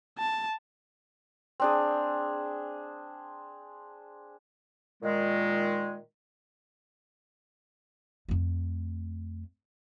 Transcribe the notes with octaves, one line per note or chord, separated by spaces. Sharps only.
A5
C4 D4 G#4
A#2 D#3 G#3
F2 A3